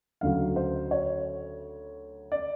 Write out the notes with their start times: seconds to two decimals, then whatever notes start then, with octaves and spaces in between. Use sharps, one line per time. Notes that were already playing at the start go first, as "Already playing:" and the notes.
0.21 D2 C#3 F#3 F5
0.56 C5
0.91 C#5
2.32 D5